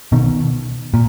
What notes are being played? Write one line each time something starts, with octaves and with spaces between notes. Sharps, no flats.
B2 D#3
A#2